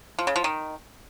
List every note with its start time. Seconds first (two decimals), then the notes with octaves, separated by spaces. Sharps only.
0.19 F3
0.27 C#3
0.36 F3
0.44 D#3